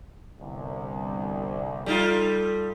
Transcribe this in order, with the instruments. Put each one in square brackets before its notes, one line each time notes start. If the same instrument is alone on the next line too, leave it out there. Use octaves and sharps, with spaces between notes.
[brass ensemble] G1 C2
[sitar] G3 D#4 F4 [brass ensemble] A4